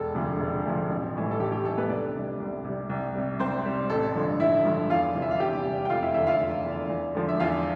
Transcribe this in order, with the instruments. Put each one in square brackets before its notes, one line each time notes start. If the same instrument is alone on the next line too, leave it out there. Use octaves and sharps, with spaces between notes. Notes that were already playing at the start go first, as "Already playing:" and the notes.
Already playing: [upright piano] E1 A4
D2 C3 F3
E1
D2 C3 F3
A1
A2 E3 G3
A4
A1 G4
G4
A2 E3 G3 A4
B3 B4
C2 D4 D5
C3 G3
C2
C3 G3
C2
C3 G3
C2 C4 C5
C3 G3
A1 A4
G2 D3 F3
A1 E4 E5
G2 D3 F3
E2 F4 F5
C3 E3 G3
E5
F5
E2 G4 G5
C3 E3 G3
G5
F1 F4 F5
E4 E5
E2 D3 E4 E5
F4 F5
F1
E2 D3
E2
D3 F3
E5
E2 F4 F5